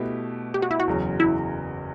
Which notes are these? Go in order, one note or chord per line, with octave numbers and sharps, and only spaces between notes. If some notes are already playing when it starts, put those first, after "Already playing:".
Already playing: B2 A3 E4 G4 B4
G4
F#4
E4
F#4
F#1 E2 C#3 F#3
E4